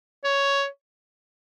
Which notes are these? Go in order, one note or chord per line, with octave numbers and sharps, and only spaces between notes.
C#5